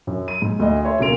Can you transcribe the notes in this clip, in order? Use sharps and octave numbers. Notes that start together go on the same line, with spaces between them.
F#2
D#7
G#2
D2 A3 D#5
C#5 E5 C6
B1 C#3 A#3 C6 D7 F7